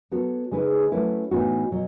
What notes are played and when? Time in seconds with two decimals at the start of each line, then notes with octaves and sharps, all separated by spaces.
0.11 F#3 B3 F#4 A4
0.51 C#3 G#3 D#4 G#4 B4
0.92 F#3 A3 C#4 E4 B4
1.31 A2 E3 B3 D#4 F#4
1.71 B2 F#3